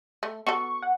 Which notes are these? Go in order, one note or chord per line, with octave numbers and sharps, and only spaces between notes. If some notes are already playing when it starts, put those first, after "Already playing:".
A3
B3 F#4 A4 C#6
F#5